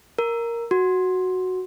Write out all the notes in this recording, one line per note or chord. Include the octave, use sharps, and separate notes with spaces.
A#4
F#4